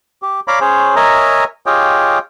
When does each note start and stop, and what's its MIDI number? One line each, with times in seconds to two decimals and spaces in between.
0.22 0.40 67
0.48 0.59 73
0.48 0.59 74
0.48 0.59 77
0.48 0.59 82
0.48 0.59 83
0.48 0.59 86
0.61 0.95 61
0.61 0.95 68
0.61 0.95 72
0.61 0.95 73
0.96 1.44 70
0.96 1.44 73
0.96 1.44 75
0.96 1.44 76
0.96 1.44 80
0.96 1.44 82
1.66 2.19 65
1.66 2.19 67
1.66 2.19 68
1.66 2.19 73
1.66 2.19 75
1.66 2.19 79